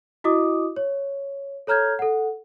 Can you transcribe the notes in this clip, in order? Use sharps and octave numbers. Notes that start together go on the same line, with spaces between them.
E4 F#4 D#5 D6 D#6
C#5
A4 C#5 A#5 F6 G6 G#6
A4 F#5